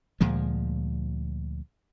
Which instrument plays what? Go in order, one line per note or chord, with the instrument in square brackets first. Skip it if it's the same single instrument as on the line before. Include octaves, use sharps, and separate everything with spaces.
[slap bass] D2 A#2 F3 G#3